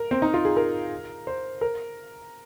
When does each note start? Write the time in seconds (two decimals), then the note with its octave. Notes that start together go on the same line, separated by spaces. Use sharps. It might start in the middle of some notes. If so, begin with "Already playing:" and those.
Already playing: A#4
0.11 C4
0.22 D#4
0.34 F4
0.45 G#4
0.57 A#4
1.27 C5
1.61 A#4